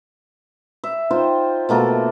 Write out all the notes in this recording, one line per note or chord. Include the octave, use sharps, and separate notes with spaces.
E5
D#4 F4 C5 G5
B2 A3 A#3 A4